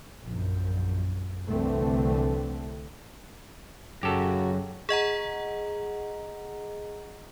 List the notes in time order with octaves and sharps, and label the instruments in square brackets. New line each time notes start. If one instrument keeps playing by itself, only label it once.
[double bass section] A#1 F#2
C2 D3 E3 A3 C4
[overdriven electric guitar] F#2 [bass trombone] C#3 [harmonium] F#4 [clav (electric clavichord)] G4 A4
[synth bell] G#4 D#5 F#5 A#5